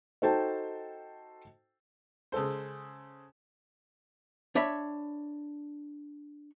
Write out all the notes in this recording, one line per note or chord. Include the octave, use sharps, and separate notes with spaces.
D#4 F#4 A4 C5 G5 A5
C#3 G#3 A4 C5
D4 C#5 E5 B5